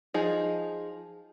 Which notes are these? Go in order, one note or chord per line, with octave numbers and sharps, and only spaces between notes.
F3 D#4 G#4